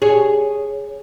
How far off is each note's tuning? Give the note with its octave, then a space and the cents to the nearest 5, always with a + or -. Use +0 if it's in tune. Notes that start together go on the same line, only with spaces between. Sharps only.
G#4 +0 C#5 +0